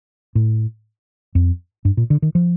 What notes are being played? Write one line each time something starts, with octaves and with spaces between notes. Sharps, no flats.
A2
F2
G2
A#2
D3
D#3
F3